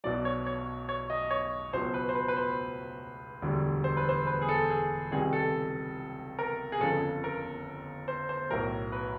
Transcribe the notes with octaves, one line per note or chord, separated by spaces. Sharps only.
B1 B2 F#3 D5
C#5
C#5
C#5
D#5
C#5
C#2 B2 F#3 C5
B4
C5
B4
B4
C5
E1 D2 D3 G3
C5
B4
C5
B4
G#4
A4
G#4
C#2 C3 D#3 G3 G#4
A4
A#4
G#4
G1 F2 C#3 F3 A4
A#4
C5
C5
B1 A2 F#3 A#4
B4